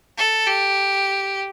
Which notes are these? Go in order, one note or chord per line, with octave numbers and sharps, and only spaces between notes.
A4
G4